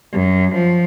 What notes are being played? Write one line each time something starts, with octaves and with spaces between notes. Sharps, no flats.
F#2
F3